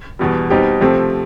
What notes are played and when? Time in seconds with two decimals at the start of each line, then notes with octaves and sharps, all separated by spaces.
0.19 E2 B2 G3
0.50 B2 G3 C4 D#4 G4
0.81 C3 F3 A3 C4